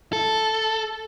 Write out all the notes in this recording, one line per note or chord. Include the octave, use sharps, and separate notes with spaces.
A4